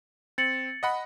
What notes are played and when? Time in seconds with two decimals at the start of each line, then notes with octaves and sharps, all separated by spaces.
0.38 C4 A6 C#7 F#7
0.83 D#5 F#5 B5